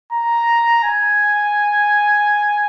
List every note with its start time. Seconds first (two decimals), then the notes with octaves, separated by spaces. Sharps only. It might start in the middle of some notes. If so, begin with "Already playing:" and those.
0.12 A#5
0.84 G#5